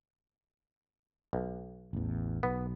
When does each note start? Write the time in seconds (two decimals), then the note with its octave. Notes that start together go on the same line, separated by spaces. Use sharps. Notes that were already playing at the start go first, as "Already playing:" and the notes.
1.33 B1
1.93 A1 E2
2.43 B1 B3